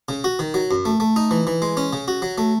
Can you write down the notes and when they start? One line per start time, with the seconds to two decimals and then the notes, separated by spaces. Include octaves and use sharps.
0.09 C#3
0.24 F#4
0.39 D#3
0.54 F#3
0.71 F#2
0.85 A3
1.00 A3
1.16 D#4
1.31 E3
1.47 E3
1.62 G#3
1.77 C#4
1.93 C#3
2.08 F#4
2.22 F#3
2.38 A3